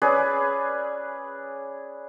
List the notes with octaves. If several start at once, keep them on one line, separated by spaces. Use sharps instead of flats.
C#4 G#4 B4 D5